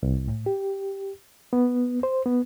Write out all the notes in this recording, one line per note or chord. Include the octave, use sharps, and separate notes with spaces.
C2
A2
G4
B3
C5
B3